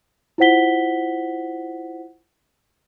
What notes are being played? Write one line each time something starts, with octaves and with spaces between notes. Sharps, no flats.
E4 F4 C5 F#5 B6 G7